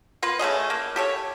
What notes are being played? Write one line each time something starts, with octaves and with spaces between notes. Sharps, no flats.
A#3 F4 B4
A3 C#4 G#4 D#5
A#3
G4 A4 C#5